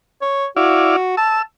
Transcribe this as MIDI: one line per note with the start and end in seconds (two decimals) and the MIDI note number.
0.21 0.46 73
0.57 0.96 64
0.57 1.13 66
0.57 0.96 74
0.57 0.96 77
1.17 1.41 81
1.17 1.42 88